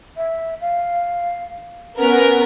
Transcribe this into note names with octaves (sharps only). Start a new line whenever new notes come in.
E5
F5
B3 C#4 A#4